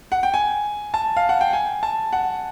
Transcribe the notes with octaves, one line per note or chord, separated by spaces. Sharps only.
F#5
G5
G#5
A5
F5
F#5
G5
G#5
A5
F#5